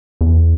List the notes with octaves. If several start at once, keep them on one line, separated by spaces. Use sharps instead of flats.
E2